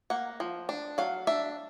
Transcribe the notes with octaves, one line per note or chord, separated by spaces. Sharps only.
A#3 F#5
F3
D4
F#3 F5
D4 E5